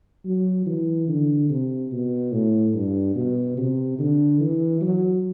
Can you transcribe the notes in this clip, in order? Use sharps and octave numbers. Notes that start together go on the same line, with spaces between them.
F#3
E3
D3
C3
B2
A2
G2
B2
C3
D3
E3
F#3